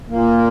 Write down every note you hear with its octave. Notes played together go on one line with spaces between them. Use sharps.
A#2 A#3